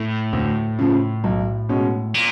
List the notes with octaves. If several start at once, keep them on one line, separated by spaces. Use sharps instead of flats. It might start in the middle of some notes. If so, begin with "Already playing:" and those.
Already playing: A2
D2
C#3 F3
B1
B2 G#3 C#4
A#2